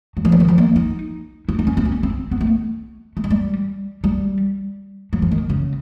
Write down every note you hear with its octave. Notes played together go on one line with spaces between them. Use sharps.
F#3
F3
E3
D#3
F3
A#3
D#4
E4
D#4
C#4
C4
C#4
C4
B3
A3
A3
G#3
G3
G3
F#3
F3
D#3
C#3